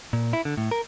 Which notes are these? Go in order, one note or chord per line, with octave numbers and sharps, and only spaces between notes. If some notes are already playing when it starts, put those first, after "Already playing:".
A#2
E4
D3
A2
A#4